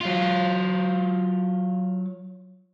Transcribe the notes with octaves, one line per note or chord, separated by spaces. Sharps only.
F#3 F4